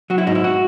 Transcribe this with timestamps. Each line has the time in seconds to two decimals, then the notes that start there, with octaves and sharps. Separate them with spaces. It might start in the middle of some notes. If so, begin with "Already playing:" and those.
0.10 F#3 F#4
0.18 E4
0.27 G#2 D#4
0.35 E4
0.44 F#4